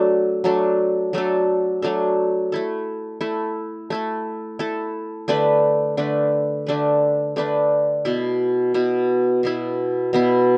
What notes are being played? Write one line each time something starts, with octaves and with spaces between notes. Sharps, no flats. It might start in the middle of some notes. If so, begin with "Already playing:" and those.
Already playing: F#3 A3 D4 A4
F#3 A3 D4 A4
F#3 A3 D4 A4
F#3 A3 D4 A4
A3 E4 A4
A3 E4 A4
A3 E4 A4
A3 E4 A4
D3 A3 D4 B4
D3 A3 D4 B4
D3 A3 D4 B4
D3 A3 D4 B4
B2 B3 E4
B2 B3 E4
B2 B3 E4
B2 B3 E4